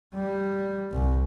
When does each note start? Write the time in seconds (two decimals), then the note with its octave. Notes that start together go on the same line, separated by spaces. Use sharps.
0.14 G3
0.92 C2